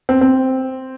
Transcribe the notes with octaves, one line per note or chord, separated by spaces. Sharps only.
C4
C4